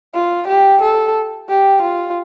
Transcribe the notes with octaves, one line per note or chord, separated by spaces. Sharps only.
F4
G4
A4
G4
F4